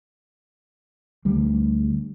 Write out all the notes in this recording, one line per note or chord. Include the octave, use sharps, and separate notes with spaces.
D2 G3